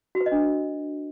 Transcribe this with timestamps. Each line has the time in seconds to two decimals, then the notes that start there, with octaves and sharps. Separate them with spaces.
0.15 F#4
0.21 B4
0.26 D#5
0.32 D4